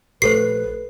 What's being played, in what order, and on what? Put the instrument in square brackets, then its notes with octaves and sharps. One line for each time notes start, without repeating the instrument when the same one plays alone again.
[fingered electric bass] A#1 A3 [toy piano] G4 A4 C5 [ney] B4 [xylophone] C7